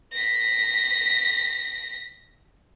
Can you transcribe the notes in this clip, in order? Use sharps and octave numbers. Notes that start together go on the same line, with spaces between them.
A#6 B6